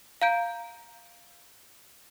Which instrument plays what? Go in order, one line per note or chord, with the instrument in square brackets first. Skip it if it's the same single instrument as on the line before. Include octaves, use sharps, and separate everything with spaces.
[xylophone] F5 A#5 G6 D7